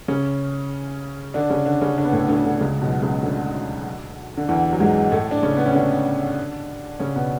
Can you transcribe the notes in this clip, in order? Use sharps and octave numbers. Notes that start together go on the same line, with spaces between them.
C#3 C#4
D3 D4
C#3 C#4
D3 D4
C#3 C#4
D3 D4
B3
A2 A3
D2 D3
D2 D3
C#2 C#3
B1 B2
C#2 C#3
D2 D3
D3
E2 E3
F#3
G#2 G#3
A2 A3
D4
C#3 C#4
B3
C#4
D3 D4
C#3 C#4
B2 B3